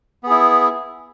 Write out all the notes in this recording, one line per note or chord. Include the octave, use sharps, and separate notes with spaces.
B3 E4 G#4